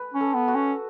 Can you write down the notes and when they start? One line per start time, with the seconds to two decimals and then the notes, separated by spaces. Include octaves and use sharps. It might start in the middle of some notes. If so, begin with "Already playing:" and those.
Already playing: B4
0.14 C#4
0.21 A4
0.34 B3
0.48 F#4
0.55 C#4